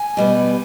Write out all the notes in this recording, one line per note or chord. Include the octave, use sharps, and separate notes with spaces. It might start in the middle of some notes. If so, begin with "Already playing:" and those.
Already playing: G#5
B2 G3 B3